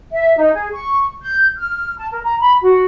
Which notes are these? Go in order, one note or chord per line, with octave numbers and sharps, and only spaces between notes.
E5
D#4
G#4
C#6
G6
F6
A5
A#4
A#5
B5
F#4